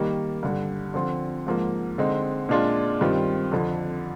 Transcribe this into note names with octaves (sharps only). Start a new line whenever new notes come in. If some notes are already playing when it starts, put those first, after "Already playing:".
Already playing: D#3 G3 A#3
G2 D3 G3
D3 F3 C4 F4
G#2 F3 A#3
D3 G#3 C4 D#4
A#2 G#3 D4 F4
G2 D#3 G3 C4 F4
F2 D3 F3